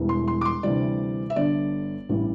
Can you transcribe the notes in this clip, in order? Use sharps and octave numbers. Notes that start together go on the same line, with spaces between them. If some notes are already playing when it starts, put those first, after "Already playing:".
Already playing: E1 E2 E3 G3
C6
C6
D6
C6
D2 C3 E3 G3 D5
E5
G1 G2 D3 D5
A1 G2 E3 G3